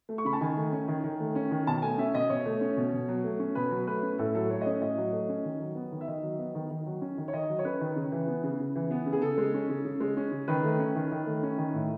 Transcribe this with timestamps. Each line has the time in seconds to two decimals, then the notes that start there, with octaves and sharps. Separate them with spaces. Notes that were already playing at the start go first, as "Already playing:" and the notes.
0.09 A3
0.18 C#6
0.25 C#3 B5
0.33 A5
0.41 D#3 G#5
0.56 A3
0.72 C#4
0.88 D#3
1.04 D#3
1.20 A3
1.35 C#4
1.51 D#3
1.67 B2 A5
1.82 A3 G#5
1.98 C#4 E5
2.14 B2 D#5
2.29 B2 C#5
2.46 A3
2.61 C#4
2.77 B2
2.93 B2
3.08 F#3
3.24 A3
3.39 C#4
3.55 B2 B4
3.71 F#3
3.87 A3 B4
4.03 C#4
4.18 A2 A4
4.34 F#3 A4
4.50 A3 C#5
4.61 D#5
4.66 C#4 C#5
4.81 A2 D#5
4.98 F#3
5.12 A3
5.29 C#4
5.45 D#3
5.60 F#3
5.75 B3
5.92 D#3
6.01 E5
6.07 D#3 D#5
6.23 F#3
6.39 B3
6.55 D#3
6.70 D#3
6.86 F#3
7.01 C#4
7.17 D#3
7.28 C#5
7.33 D#3 D#5
7.49 F#3
7.59 C#5
7.65 C#4 B4
7.81 D#3
7.96 C#3
8.12 E3
8.27 B3
8.44 C#3
8.59 C#3
8.76 E3
8.91 B3
9.06 C#3
9.13 G#4
9.22 C#3 A4
9.38 G#3
9.54 C#4
9.69 C#3
9.85 C#3
10.00 G#3
10.17 C#4
10.32 C#3
10.48 D#3 B4
10.64 A3
10.79 C#4
10.96 D#3
11.11 D#3
11.26 A3
11.43 C#4
11.58 D#3
11.74 A2